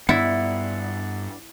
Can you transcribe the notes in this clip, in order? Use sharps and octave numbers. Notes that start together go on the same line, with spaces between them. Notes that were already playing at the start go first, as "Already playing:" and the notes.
G2 B3 E4 D5 F#5